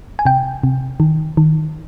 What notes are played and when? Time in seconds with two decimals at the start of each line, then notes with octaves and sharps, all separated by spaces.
0.19 G#5
0.25 C3 G5
0.63 C3
1.00 D#3
1.37 D#3